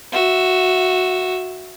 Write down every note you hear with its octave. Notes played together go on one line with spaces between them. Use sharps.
F#4 E5